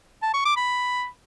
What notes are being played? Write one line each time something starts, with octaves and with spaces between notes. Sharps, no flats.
A5
C#6
D6
B5